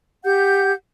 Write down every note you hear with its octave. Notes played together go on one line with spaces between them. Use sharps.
G4 F#5 G6